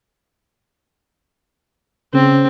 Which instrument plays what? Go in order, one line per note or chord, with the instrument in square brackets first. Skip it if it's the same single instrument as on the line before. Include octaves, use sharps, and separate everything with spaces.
[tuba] C#3 [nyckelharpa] C4